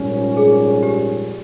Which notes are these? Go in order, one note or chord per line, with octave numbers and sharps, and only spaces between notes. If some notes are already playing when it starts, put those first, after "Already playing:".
Already playing: A#1 G#2 G3 C#4
G#4
G4